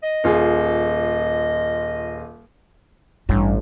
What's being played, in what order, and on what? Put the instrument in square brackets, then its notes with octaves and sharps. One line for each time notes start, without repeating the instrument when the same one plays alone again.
[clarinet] D#5
[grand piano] D#1 F4 G#4
[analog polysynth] A1 [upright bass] G2